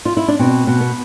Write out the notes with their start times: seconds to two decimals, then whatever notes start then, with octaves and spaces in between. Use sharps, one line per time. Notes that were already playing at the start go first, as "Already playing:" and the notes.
0.05 F4
0.17 E4
0.28 D4
0.39 B2 C4
0.67 B2
0.80 B3